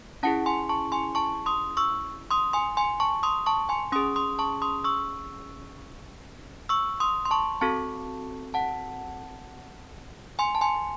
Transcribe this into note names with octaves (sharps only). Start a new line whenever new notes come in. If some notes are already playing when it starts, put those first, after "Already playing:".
C#4 E4 G#4 F#5 A5
G#5 C6
A5 C#6
G#5 C6
A5 C#6
C6 D#6
C#6 E6
C6 D#6
G#5 C6
G#5 C6
A5 C#6
C6 D#6
A5 C#6
G#5 C6
C#4 G#4 C6 D#6
C6 D#6
A5 C#6
C6 D#6
C#6 E6
C#6 E6
C6 D#6
C6
A5 C#6
C4 F#4 A4 A5 C#6
F#5 A5
G#5 C6
A5
G#5 C6